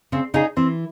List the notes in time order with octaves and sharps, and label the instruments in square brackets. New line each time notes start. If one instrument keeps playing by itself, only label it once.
[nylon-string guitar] C#3 [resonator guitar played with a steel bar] C4
[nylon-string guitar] C#3 [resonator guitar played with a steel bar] D#4 G#4
[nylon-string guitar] E3 [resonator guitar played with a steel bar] C4